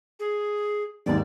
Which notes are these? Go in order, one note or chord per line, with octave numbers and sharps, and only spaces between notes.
G#4
G#1 D#2 G#2 D5